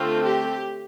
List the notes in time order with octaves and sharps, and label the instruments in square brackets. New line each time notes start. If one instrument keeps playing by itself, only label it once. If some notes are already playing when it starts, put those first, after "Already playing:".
Already playing: [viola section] D3 A3 C4 F4
G4